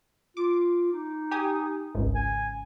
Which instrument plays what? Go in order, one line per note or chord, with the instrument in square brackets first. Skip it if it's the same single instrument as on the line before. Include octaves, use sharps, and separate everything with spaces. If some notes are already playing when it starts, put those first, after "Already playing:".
[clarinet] F4 [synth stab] D6
[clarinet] D#4
[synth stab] G4 G#5 D#6
G#1 C#2
[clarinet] G#5